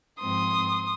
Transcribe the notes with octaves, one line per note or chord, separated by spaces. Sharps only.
G#2 F3 C4 C6 D#6